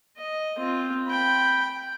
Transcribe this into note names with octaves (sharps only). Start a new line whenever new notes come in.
D#5
C4 F4
G5 B5